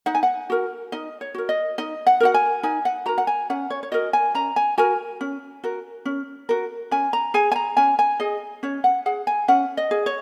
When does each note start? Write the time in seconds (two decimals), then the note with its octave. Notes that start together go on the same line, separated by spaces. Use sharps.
0.06 D#4 F#5
0.15 G#5
0.23 F#5
0.50 F#4 A#4
0.92 D#4 D#5
1.21 C#5
1.35 F#4 A#4
1.49 D#5
1.78 D#4 D#5
2.07 F#5
2.20 F#4 A#4 F#5
2.34 G#5
2.63 D#4 G#5
2.85 F#5
3.06 F#4 A#4 A#5
3.18 F#5
3.27 G#5
3.50 C#4 F#5
3.70 C#5
3.83 C#5
3.92 F#4 A#4 D#5
4.13 G#5
4.35 C#4 A#5
4.56 G#5
4.78 F#4 A#4 G#5
5.21 C#4
5.64 F#4 A#4
6.05 C#4
6.49 F#4 A#4
6.91 C#4 G#5
7.13 A#5
7.34 G#4 G#5
7.52 G#5
7.56 A#5
7.77 C#4 G#5
7.99 G#5
8.20 G#4 D#5
8.63 C#4 C#5
8.84 F#5
9.06 G#4 F#5
9.27 G#5
9.48 C#4 F#5
9.77 D#5
9.91 G#4
10.06 C#5